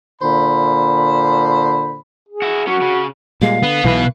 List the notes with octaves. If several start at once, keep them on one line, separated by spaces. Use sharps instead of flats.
A#2 D3 C5 B5
G#4
E4 F#4
F#3 C#4 F#4
C#3
A#2 G3 G#3 F5
D3 B3
B1 B2 E3 B4